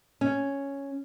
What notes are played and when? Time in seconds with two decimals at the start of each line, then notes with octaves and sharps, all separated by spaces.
0.21 C#4